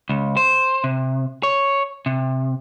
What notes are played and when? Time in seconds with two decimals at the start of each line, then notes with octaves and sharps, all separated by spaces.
0.09 C#2
0.37 C5
0.84 C3
1.43 C#5
2.06 C3